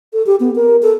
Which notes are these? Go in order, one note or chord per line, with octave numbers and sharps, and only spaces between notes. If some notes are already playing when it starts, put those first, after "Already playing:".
A4
G4
B3
A#4
A4